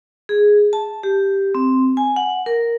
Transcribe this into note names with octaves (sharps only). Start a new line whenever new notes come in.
G#4
A5
G4
C4
G#5
F#5
A#4